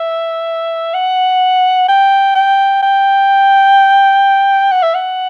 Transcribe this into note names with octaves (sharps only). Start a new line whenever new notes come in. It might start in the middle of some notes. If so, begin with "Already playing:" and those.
Already playing: E5
F#5
G5
G5
G5
F#5
E5
F#5